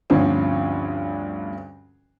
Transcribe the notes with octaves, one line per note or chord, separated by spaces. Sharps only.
D2 G2 D3 F3 C4 C#4